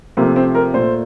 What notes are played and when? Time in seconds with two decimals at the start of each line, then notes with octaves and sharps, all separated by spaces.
0.17 C3 F3 A3 A#3
0.36 C4
0.55 A#4
0.74 A#2 A3 C5